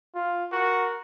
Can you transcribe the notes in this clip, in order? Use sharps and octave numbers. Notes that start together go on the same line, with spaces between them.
F4
F#4 A#4